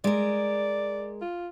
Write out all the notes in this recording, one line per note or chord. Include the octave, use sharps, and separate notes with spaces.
G#3 A#4 D5
F4